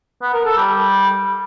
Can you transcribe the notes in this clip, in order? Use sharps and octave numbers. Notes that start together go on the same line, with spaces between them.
B3
A#4
A4
G3